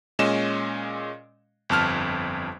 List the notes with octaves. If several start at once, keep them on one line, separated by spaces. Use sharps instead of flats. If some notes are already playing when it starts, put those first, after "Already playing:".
A#2 G#3 C#4 D#5 E7
G1 F2 A5 F6